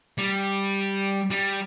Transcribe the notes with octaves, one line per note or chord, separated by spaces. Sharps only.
G3
G3